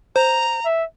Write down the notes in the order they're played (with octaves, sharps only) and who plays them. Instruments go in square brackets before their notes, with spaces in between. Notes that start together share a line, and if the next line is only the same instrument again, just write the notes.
[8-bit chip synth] C5 [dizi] A#5
[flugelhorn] E5